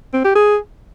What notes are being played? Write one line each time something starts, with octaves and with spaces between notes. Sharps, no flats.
C4
G4
G#4